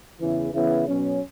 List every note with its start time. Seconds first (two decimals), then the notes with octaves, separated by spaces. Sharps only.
0.20 E2 C#3 E3
0.54 C#3 E3 B3 E4
0.87 B2 F#3 C#4